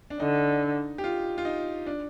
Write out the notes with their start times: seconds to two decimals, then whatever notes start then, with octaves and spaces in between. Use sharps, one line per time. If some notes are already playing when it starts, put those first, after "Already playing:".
0.10 D4
0.20 D3 D#4
0.98 G4
1.04 F4
1.38 F4
1.45 D#4
1.86 D4